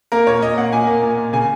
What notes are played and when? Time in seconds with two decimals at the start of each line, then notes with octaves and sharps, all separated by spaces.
0.12 A#3 A#4
0.27 A#2 C#5
0.42 A#2 D#5
0.58 A#3 F#5
0.73 A#2 G#5
0.87 A#3
1.03 A#2
1.17 A#2
1.33 C#3 G#5